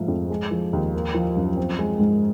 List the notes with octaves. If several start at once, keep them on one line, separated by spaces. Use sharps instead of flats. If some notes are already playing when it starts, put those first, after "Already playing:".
Already playing: G#2 F3 A3
F2
G#3
F3
D#2
A#3
F3
F#2
C4
G#3
G#2